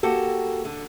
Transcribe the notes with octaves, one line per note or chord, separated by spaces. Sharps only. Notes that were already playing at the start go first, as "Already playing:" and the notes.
A#3 F#4 G4 A4
D3